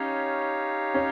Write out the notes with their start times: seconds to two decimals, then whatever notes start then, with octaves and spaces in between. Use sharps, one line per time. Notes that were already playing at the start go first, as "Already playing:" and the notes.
Already playing: C#4 D#4 G4 C#5 F5
0.94 C#4